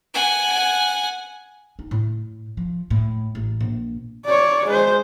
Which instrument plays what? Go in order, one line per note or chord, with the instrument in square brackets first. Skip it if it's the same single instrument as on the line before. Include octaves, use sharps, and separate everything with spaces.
[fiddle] F#5 G#5
[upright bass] D#4
A2
F3
A2
A1
A#1
[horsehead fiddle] C#5 D5
G#3 C5